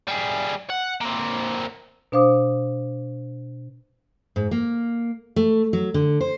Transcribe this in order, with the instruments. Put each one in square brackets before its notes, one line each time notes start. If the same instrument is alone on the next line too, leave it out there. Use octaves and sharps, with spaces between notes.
[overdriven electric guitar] G3 G#4
F#5
A#3 C4
[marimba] B2 D4 C5 F5 D6 D#6
[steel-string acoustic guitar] G#2
A#3
A3
F#3
D3
C5